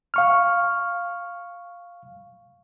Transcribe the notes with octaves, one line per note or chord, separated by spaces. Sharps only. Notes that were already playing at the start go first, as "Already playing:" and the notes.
F5 C#6 F6